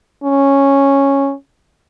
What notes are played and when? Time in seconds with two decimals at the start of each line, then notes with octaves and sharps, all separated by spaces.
0.24 C#4